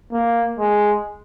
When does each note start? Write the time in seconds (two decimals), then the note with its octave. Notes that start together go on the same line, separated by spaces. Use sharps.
0.13 A#3
0.59 G#3